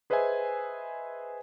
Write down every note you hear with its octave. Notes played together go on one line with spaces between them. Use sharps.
G#4 B4 C5 D#5 E5 G#5